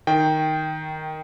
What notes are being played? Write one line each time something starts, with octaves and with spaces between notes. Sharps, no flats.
D#3 G5